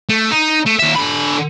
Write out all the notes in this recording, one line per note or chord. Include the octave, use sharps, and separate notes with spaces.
A3
D#4
A3
D#2 E5
D3 B5